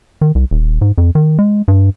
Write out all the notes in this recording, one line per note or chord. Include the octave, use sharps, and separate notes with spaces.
D#3
C2
D#1
G#2
F2
D#3
G#3
G2